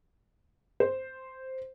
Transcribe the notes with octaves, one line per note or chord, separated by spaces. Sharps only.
C5